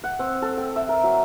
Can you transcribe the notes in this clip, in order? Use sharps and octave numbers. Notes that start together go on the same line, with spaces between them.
F#5
C4
A4
G5
E5
A#4
F#3